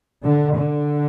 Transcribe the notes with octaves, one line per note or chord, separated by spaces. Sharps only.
D3
D3